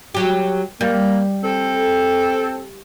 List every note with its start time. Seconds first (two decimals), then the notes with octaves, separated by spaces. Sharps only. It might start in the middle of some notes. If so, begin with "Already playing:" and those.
0.14 F#3 G4
0.81 G3 A#3
1.43 C4 A4